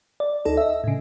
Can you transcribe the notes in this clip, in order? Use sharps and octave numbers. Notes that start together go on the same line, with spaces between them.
D5
D2 D#4 A4
D#5 E5
A2 C#3